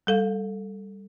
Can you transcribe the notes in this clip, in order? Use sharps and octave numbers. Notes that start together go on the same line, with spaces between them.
G3 A4 F5